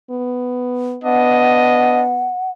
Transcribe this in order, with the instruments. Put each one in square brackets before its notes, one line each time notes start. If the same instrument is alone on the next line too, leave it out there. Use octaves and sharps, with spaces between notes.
[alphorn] B3
[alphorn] B3 [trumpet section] D4 D#5 [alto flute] F#5